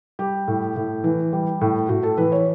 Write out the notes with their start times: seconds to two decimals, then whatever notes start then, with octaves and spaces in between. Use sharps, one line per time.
0.19 G3 G4
0.48 A2
0.76 A2
1.04 E3
1.33 G3
1.61 A2
1.89 A2 F#4
2.03 A4
2.18 E3 B4
2.32 C#5